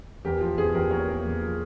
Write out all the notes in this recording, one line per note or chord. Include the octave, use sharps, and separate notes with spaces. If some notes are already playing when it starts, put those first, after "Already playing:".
E2 G4 A#4
F3
E2 G#4
E2 G4 A#4
A#3 A#4 C#5
A#3
E2
F3